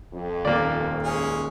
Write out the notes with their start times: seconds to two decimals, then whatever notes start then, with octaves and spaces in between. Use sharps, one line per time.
0.14 F2
0.45 D#1 A#3 D5
1.03 G#3 C#4 G#4